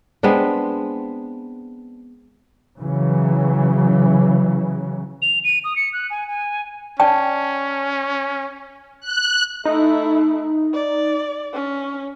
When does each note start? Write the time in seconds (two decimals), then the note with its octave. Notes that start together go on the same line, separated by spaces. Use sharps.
0.23 G#3 B3 C4 D4
2.78 C#3 E3 F#3
5.22 F7
5.44 D#7
5.64 D#6
5.76 C#7
5.93 F#6
6.10 G#5
6.27 G#5
7.00 C#4 D5 G5 A5
9.01 F#6
9.65 A3 D#4 E4
10.73 D5
11.53 C#4